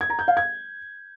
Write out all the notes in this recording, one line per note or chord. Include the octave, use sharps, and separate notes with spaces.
G#6
A#5
G6
F5
G#6